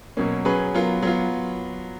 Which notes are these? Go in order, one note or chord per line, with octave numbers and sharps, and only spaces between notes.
B2 F#3 A#3 C#4
F#3 C#4 G#4 B4
F#3 B3 F4 A#4
F#3 B3 F4